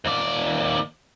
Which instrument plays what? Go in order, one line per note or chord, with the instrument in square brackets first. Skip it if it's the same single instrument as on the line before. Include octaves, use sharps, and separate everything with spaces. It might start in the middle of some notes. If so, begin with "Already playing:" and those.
[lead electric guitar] D#2 D5